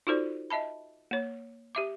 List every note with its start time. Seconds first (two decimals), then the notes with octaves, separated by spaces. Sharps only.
0.07 D#4 F4 F#4 A4 C5 D5
0.50 D#5 E5 A5 B5
1.11 A#3 C#5
1.75 G4 E5 D6